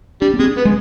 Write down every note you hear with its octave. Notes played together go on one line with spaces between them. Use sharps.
G3 D4
B3
G#3 C4
B3
G#3